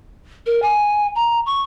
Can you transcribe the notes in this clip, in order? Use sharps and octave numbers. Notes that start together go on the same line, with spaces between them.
A#4
G#5
A#5
C#6